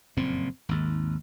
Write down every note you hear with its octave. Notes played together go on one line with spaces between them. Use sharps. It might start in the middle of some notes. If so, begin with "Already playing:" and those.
F#1 F2 A#2 C4
G#1 D#2